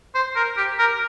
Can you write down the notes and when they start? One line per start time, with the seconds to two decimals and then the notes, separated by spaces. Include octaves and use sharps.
0.15 C5
0.36 A#4
0.57 G4
0.79 A#4